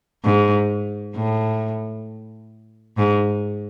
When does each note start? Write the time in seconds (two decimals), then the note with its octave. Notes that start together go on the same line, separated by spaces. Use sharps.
0.24 G#2
1.16 A2
2.98 G#2